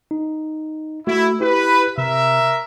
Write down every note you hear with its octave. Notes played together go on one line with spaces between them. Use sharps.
D#4
A3 E4 F#4
E4 G4 B4
C3 A#4 E5